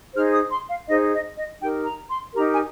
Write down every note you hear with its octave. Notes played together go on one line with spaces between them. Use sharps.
D#4 G#4 C5 F6
D#6
C6
F5
D#4 G#4 C5 D#5
D#5
D#5
D#4 G4 A#4 G5
A#5
C6
D#4 G4 A#4 A#5
G#5